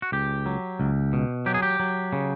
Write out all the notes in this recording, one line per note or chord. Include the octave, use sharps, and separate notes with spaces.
F#4
C#2 G4
F#3
C#2
B2
F#3 G4
G#4
G4
F#3
C#3